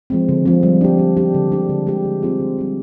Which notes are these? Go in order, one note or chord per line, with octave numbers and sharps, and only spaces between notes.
F3 G#3 C4
D3
F3 G#3 C4
G3
D4 G4
G3
D4 G4
D3
G#3 D4 G4
D3
G#3 D4 G4
D3
G3 C4 F4 G#4
D3
G3 C4 F4 G#4